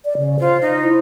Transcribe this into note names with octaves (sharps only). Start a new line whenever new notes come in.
D5
C#3
F4 C5
D#4
E4